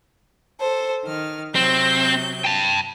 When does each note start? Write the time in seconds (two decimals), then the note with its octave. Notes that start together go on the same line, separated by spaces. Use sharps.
0.59 A4 C5
1.04 D#3 F6
1.55 C3 F#3 C4 G6
2.44 G5 A5